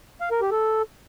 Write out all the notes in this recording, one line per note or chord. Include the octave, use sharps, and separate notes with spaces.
F5
A#4
G4
A4